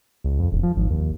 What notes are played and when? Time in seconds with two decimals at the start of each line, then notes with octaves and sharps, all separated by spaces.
0.24 C#2
0.39 F2
0.52 D1
0.63 F3
0.76 G#1
0.90 D#2